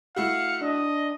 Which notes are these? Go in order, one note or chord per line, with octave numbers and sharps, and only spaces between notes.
A3 E4 F#4 F5 C#7
D4 D#5